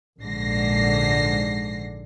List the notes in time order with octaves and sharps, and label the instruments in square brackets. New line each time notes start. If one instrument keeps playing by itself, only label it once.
[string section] A#1 G#2 D3 A#6 C7